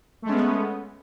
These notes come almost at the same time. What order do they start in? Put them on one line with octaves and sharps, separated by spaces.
A3 G#3 C#4 B3